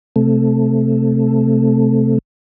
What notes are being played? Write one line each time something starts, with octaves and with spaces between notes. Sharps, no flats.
C3 A3